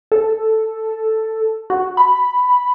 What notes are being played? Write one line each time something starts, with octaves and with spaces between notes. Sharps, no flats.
A4
F#4
B5